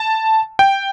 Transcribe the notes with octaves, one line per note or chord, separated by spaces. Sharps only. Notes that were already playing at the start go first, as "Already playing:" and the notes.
Already playing: A5
G5